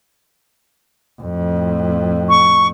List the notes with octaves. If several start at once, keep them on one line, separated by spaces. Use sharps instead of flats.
F2 A2
C#6